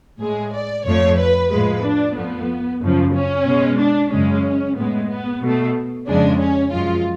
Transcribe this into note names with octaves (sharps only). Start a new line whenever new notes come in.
A2 G#3 G#4
D5
F2 F3 A3 C#5
B4
A2 F3 G#3 B4
D4
F2 F3 A3 B3
F#2 C#3 F3
C#4
B2 G#3
D4
F#2 C#3 G#3 C#4
A2 G#3 B3
B3
B2 A3
F2 C#3 G#3 D4
C#4
F#2 F3 G#3 F4